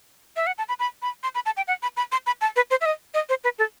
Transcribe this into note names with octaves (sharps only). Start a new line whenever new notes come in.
E5
F#5
A5
B5
B5
B5
C6
B5
A5
G5
F#5
B5
B5
C6
B5
A5
B4
C5
E5
D#5
D#5
C5
B4
A4